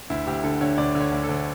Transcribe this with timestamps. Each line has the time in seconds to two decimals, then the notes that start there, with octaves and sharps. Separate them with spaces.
0.10 D2 E4
0.27 D2 G4
0.44 D3 A4
0.61 D3 C#5
0.78 D2 D5
0.95 D3
1.00 C#5
1.12 D2
1.23 A4
1.29 D2